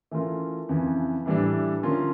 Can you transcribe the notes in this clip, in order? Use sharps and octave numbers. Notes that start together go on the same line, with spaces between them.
E3 A3 C#4 F4 A#4
F2 C#3 E3
A2 E3 G3 D4
D3 F3 C#4 F4 A#4